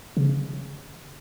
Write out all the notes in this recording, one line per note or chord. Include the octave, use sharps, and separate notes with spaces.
C#3